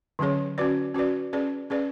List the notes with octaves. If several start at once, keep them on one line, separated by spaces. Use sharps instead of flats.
D3 F#3 C#4 G#4 C#5
C#4 F#4 B4 D5
C#4 F#4 B4 D5
C#4 G#4 B4 D5
C#4 G#4 B4 D5